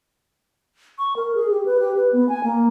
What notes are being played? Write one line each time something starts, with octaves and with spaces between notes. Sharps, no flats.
C#6
A#4
G#4
G4
B4
G4
B4
B3
G#5
A#3